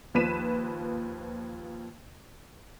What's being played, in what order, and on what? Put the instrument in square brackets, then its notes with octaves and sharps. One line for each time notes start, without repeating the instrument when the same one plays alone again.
[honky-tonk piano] D#2 F3 B4 B6 D#7 E7